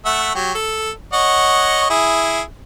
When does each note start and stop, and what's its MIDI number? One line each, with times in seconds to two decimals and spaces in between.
0.06 0.32 57
0.06 0.32 76
0.06 0.32 78
0.35 0.53 54
0.35 0.53 67
0.55 0.91 69
1.13 1.88 73
1.13 1.88 75
1.13 1.88 78
1.90 2.41 64
1.90 2.41 68